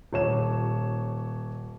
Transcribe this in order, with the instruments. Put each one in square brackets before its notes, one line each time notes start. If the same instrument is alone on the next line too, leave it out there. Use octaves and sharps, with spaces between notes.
[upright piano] D#1 C#5 E7